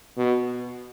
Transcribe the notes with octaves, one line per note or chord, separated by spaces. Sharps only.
B2